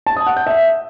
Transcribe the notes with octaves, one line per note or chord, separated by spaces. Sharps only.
A5
D#6
F#5
G6
E5